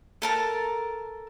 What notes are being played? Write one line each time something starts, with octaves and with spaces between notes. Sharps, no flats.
A4 A#4 A5